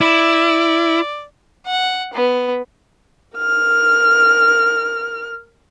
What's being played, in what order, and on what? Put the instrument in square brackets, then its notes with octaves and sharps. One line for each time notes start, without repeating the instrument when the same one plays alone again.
[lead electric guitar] E4 [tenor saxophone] D5
[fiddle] F#5
B3
[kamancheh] A#4 F6